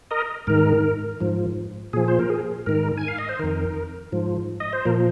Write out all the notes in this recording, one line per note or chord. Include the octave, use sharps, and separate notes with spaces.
A#4 D#5
G#2 D#3 A#4
G#2 F3
A#2 F3 G#4
C5
A#4
G#4
G#2 D#3 A#4
G#5
F5
D#5
C5
F2 D#3 A#4
G#2 F3
D#5
C5
A#2 F3 A#4